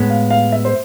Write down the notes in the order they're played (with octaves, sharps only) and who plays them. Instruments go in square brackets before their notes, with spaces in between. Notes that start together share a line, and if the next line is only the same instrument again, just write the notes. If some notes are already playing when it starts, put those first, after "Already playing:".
Already playing: [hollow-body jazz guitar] A2 G#3 B3
[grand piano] F5
F5
E5
C5